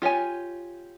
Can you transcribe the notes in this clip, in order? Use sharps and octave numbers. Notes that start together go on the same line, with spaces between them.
F4 G4 C#5 G#5